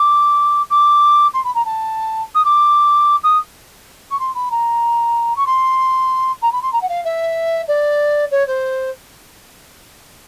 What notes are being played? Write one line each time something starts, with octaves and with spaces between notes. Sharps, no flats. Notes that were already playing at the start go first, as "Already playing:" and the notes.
Already playing: D6
D6
C6
B5
A#5
A5
D#6
D6
D#6
C#6
C6
B5
A#5
C#6
C6
A#5
B5
C6
A#5
F#5
F5
E5
D5
C#5
C5